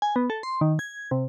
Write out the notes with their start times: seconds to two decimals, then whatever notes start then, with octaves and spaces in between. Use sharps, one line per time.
0.02 G#5
0.16 B3
0.30 A4
0.43 C6
0.61 D#3
0.79 G#6
1.11 C3